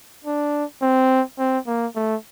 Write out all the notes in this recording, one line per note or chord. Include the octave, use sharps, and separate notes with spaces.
D4
C4
C4
A#3
A3